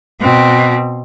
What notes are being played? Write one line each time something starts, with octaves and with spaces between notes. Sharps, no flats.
B2 C4